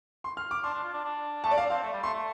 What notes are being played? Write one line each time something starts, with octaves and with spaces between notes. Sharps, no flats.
C6
F6
D6
D4 C6
D4
F4
D4
D4
A3 A5
D5
D4 F5
C4 F5
A3
G3
A3 C6
A3